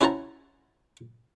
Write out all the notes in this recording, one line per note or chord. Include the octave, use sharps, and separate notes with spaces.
C#4 E4 F#4 C5 A5 A#5